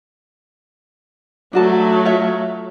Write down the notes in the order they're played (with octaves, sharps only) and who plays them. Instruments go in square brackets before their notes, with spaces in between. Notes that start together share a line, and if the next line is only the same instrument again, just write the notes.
[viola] F#3 A3 [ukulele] D4 F#4 A5
[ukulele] F4 C#5 E5